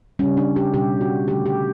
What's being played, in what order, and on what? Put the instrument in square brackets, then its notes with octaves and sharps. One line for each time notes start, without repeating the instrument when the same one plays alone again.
[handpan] C#3 G3 C#4
D4
G4
B2 G3 G4
F#4
D3 A3 G4
G4